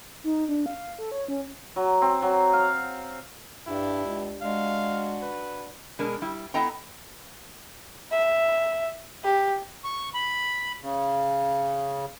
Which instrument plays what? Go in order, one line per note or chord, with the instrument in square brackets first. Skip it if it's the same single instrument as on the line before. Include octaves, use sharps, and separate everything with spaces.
[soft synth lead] D#4
D4
F5
A4
C#5
C#4
[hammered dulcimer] F#3
C4
F#3
F5
[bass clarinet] G2 [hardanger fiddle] D4 G4 [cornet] E4
[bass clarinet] C#2
[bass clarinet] G#3 [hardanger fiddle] D4 F#4 [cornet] F5
[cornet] B4
[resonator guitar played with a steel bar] B2 G#3 D4 A#4
G3 E4
B3 E4 A4 D#5 G5 A#5
[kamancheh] E5
G4
[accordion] C#6
B5
C#3